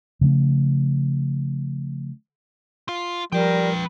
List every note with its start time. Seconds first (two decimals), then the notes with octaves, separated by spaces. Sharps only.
0.21 C#3 F3 A3 C#4
2.89 F4
3.32 F3 G3 A#4 B4 G5